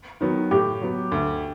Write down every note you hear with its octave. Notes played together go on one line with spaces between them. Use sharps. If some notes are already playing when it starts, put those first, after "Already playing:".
D#3 F#3 B3
A2 G4
F#3 B3
D2